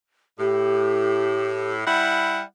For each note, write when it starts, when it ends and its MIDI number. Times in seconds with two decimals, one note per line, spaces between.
0.39 1.85 45
0.39 1.72 67
1.87 2.41 55
1.87 2.41 64
1.87 2.41 78